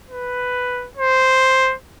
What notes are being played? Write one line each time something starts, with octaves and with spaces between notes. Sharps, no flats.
B4
C5